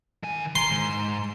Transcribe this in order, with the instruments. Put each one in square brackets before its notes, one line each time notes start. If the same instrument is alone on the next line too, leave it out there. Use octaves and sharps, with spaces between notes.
[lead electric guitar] D#3 G#5
[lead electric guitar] D#3 A#5 [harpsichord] C6
[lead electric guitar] G#2